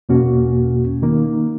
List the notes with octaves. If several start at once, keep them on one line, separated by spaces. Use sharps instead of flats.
E2 B2 A#3 C#4 F#4
D#3 A#3 D#4